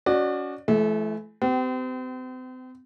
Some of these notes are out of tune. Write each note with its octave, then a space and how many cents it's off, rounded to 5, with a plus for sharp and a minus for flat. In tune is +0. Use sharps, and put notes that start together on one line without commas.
C#4 +25 F#4 +0 D5 +35
E3 +20 A3 -35
C4 -40 G4 -25